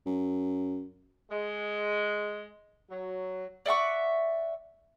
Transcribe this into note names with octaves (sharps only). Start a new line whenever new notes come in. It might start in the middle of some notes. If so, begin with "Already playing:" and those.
F#2
G#3
F#3
D5 E5 F#5 C#6